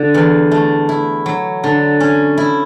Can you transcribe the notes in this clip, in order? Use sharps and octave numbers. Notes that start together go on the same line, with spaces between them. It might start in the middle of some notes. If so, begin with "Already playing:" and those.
Already playing: D3
E2
A3
E4
F#3
D3
C#4
E4